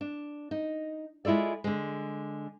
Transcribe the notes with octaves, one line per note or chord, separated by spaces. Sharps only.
D4
D#4
G#3 E4 F4 A4 D5
D3 G#3